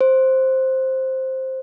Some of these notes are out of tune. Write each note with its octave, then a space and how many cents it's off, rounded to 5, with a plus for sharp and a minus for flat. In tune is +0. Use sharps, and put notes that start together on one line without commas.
C5 +5